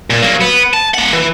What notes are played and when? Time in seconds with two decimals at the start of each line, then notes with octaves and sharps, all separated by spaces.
0.10 A#2
0.22 F#3 A#3
0.41 B3
0.73 A5
0.94 A#3 F#5
1.12 E3